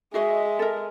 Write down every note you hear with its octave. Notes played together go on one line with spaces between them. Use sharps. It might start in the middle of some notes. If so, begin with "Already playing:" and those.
G#3 F#4 G#4 D#5 E5
A4 A#4